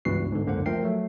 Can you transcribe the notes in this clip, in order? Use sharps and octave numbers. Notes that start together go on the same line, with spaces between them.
C#2 G2 E3 B3 F#4 C7
G#2 D3
C#2 F#2 D3 A#3 C5 F#5
F3 A3 A#4 G5 C7
F#3 A3